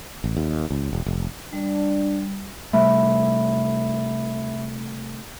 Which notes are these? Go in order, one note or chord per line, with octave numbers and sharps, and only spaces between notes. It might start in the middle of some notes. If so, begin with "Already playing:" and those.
A1
D#2
C#2
E1
F1
G3 D4
C3 G3 A3 E5 B5